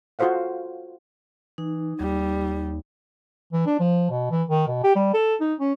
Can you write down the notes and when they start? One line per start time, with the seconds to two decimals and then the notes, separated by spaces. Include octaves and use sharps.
0.19 F4 F#4 A4 C5 F5 F#5
1.58 E3 D#4
2.00 D#2 G3
3.53 E3
3.66 D4
3.80 F3
4.10 B2
4.31 E3
4.49 D#3
4.67 B2
4.84 G4
4.96 G3
5.14 A4
5.40 D#4
5.60 C#4